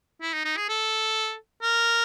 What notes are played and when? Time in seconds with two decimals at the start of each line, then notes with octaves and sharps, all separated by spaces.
0.22 E4
0.33 D#4
0.45 D#4
0.57 G#4
0.69 A4
1.62 A#4